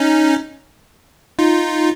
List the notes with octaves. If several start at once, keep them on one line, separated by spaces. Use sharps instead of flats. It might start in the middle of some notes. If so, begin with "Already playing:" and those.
Already playing: C#4 D#4
D#4 F4